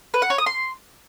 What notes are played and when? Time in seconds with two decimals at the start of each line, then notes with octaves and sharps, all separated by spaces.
0.14 B4
0.22 F#5
0.30 C#5
0.38 D#6
0.46 C6